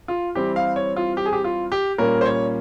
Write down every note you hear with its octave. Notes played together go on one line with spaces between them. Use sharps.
F4
E3 G3 C4 G4
F5
C#5
F4
G4
G#4
G4
F4
G4
A#2 G3 A#3 C#4 A#4
C5
C#5